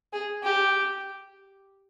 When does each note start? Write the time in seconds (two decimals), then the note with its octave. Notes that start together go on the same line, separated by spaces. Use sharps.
0.13 G#4
0.43 G4